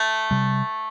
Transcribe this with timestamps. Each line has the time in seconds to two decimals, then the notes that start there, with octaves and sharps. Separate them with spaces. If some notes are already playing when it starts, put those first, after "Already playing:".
Already playing: A3
0.31 C3 G3